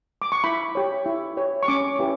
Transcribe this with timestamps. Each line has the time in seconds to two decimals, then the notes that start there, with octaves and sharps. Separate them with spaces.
0.22 D6
0.32 C#6
0.44 E4 B5
0.75 G4 C#5
1.06 E4
1.37 G4 C#5
1.63 C#6
1.68 C#4 D6
1.99 E4 G4 B4